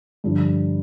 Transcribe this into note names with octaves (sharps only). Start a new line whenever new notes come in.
G2 D3 F3